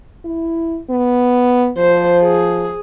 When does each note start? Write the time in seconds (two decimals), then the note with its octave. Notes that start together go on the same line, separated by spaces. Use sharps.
0.25 E4
0.90 B3
1.77 F3 C5
2.23 G#4